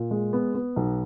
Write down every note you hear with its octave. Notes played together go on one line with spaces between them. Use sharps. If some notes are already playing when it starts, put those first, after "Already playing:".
Already playing: A#2
G#3
B3
B3
B1